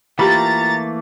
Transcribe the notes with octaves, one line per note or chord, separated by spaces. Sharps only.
E3 A3 A#3 F4 G4 A#5 B5 A6